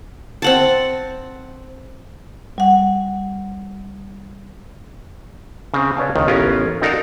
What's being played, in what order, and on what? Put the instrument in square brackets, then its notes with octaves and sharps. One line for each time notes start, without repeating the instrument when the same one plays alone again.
[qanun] C4 F#5 A5
[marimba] G3 F#5
[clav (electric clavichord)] C#3 C4
B4 C#5 D5 F5 G#5 A5
C#2 D#3
A1 B3 C#4 F4 A#4
D#4 F#4 A4 A#4 D5 F5